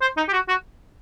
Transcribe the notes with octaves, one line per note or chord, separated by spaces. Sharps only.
C5
D#4
G4
F#4
F#4